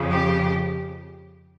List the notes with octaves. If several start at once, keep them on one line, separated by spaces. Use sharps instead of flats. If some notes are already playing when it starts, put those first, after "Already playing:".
Already playing: F2 C#3 F3
G4